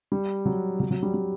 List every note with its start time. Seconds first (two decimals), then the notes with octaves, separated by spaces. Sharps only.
0.12 G3
0.45 F#3
0.80 F#3
0.91 F#3
1.03 G3
1.14 G3